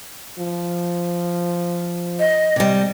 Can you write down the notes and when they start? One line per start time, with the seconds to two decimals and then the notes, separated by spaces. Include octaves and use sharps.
0.38 F3
2.19 D#5
2.56 C3 G3